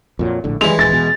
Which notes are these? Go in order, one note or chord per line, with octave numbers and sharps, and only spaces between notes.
F2 A#2 F#3
A#1 A2 D3
E3 G3 G#3 F7
D#1 A6
E2 B2